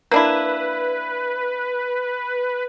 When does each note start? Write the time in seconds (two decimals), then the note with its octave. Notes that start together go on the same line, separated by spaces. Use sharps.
0.11 A#3 D4 E4 B4